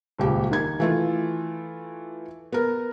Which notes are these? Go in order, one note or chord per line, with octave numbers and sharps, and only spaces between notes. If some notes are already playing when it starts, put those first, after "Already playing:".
D#1 C#2 G4
D#3 G#6
E3 A3 F4
B3 A#4